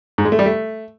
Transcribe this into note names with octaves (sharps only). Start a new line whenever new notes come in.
G#2
G#3
A3
G3
A3